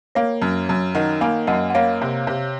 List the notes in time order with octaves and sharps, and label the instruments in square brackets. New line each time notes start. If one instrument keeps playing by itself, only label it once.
[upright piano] A#3 [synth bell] C#5 F5
[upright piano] F#2
F#2
[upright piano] D#3 [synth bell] D#5 F#5
[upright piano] A#3 [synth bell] F5 G#5
[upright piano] F#2 [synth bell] D#5 F#5
[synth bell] F#5
[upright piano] A#3 [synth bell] C#5 F5
[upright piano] C3
C3